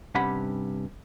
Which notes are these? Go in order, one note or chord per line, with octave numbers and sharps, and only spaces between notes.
G2 C3 C#4 G4 F#5 B5